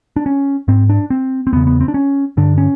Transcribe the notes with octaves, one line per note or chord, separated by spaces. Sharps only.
D4
C#4
G#2 C4
D4
C4
C4
E2 C#3 B3
B3
C4
D4
C#4
G2 D3 D4
C#4